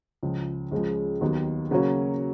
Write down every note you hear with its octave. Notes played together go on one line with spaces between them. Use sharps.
C#2 C#3 F3
C#2 C#3 F3 G#3
D#2 D#3 F#3 B3
C#3 F#3 A#3 C#4 F#4